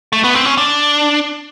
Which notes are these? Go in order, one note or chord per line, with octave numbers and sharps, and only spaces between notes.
A3
B3
C4
C#4
D4